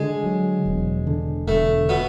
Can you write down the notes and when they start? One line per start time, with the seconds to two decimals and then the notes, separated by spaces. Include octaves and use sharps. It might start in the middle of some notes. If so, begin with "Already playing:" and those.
Already playing: D3 G#3
0.24 F#3
0.66 E1
1.07 D3
1.47 E1 A3
1.89 B2 B3